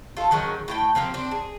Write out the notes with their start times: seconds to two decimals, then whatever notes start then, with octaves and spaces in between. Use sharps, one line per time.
0.17 F4 A4
0.31 D#3 F#3 G#3 C#4
0.68 A2 F4 G5
0.95 C3 F3 A#3 C4
1.14 C4 D4
1.31 G#4